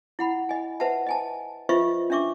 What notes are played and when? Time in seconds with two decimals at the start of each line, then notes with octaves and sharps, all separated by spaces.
0.19 E4 F#5 B5
0.49 D#5 G#5
0.80 B4 C5 E5 F#5 A5
1.07 D#5 G#5 A5
1.69 F4 B4 C5 D#5 E5 C#6
2.10 C#4 D4 E5 C#6 D6